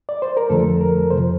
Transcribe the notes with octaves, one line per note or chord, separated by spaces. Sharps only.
D5
C5
A#4
F2 D3 F3 A3 A4
A#4
F2 C3 F3 C5